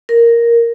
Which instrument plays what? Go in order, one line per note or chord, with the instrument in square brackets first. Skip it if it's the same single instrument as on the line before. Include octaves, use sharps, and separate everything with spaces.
[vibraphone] A#4